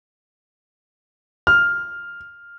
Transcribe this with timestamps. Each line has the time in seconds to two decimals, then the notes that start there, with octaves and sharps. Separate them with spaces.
1.47 F6